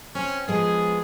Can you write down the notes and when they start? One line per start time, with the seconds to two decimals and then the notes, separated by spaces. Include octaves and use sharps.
0.15 C4 C#4
0.48 F3 G#3 B3 G#4